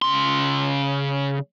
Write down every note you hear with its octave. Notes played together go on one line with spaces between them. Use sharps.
C#3 C6